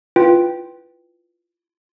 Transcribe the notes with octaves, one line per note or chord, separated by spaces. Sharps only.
E4 F4 B4 G5